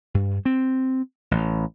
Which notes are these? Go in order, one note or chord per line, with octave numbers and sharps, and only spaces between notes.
G2
C4
A1